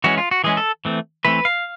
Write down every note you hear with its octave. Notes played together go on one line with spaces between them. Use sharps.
E3 G#3 C#4 F#4
F4
F#4
E3 G#3 C#4 G#4
A4
E3 A3 C4
E3 A3 C4 B4
F5